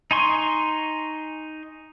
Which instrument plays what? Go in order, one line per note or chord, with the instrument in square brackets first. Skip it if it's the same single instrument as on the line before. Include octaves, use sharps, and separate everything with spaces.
[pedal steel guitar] D#4 G#5 C6 C#6